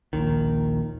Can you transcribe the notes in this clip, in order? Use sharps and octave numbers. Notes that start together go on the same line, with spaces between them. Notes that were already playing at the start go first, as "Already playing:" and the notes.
A#1 D#2 D#3